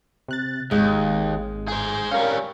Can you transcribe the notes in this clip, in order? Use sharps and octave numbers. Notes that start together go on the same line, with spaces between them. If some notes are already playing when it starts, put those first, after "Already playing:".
C3 F#6 A6
G#1 D#2 G#3
G#4 C5
G3 C#4 A#4 F5